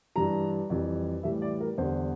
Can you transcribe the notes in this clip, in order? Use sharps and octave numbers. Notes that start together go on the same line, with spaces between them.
G2 E3 G3 A#5
F2 E3 G3
A2 E3 G3 E5
D5
A#4
E2 D3 G3 C5